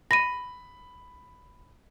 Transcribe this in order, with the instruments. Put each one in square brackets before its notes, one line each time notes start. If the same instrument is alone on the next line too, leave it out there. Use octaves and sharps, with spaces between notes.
[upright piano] B5 [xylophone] A#6 D#7